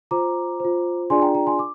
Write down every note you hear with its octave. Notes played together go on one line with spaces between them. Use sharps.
F4 C5 A#5 D6
F4 C5
D4 F4 G#4 D5 G#5 C6
G5 A#5
G5 A#5
G#5 C6
D6